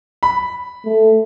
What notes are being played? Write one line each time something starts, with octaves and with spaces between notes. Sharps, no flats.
B5
A3